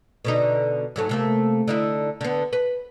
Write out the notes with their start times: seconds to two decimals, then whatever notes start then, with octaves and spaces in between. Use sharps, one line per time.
0.25 B2 D3 D#4
0.96 G#2 F#3 A3
1.09 C3 A3 A#3
1.67 D3 D#4 E4
2.21 D3 B3
2.53 B4